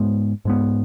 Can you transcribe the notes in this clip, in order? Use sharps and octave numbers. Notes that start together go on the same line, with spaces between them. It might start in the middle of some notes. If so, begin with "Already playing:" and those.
Already playing: G#2 G#3 B3
G#2 G#3 B3